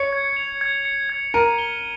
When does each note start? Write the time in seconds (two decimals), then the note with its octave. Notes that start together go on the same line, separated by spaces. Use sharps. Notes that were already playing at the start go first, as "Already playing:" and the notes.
Already playing: C#5 C#7
0.13 G#6
0.37 F7
0.61 G#6
0.85 C#7
1.09 G#6
1.34 A#4 D#7
1.58 G7